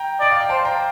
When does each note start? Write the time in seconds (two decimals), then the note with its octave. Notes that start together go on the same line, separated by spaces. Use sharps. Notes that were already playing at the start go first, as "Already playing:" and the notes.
Already playing: G5 A#5
0.20 D5 D#5
0.31 F5
0.41 G5
0.49 C5 F5 A5
0.65 G5 A#5